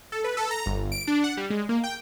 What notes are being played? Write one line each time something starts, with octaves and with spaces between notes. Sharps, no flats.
A4
B4
A4
A#5
G1
D7
D4
F#5
G3
G#3
A#3
G5